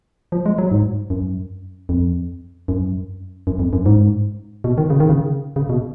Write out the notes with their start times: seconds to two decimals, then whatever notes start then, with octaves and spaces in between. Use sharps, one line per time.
0.32 F3
0.46 G#3
0.58 F#3
0.71 G#2
1.10 F#2
1.89 F2
2.68 F#2
3.47 F#2
3.59 F2
3.73 F#2
3.86 G#2
4.64 B2
4.78 D#3
4.90 C#3
5.00 D#3
5.09 C#3
5.56 C#3
5.69 B2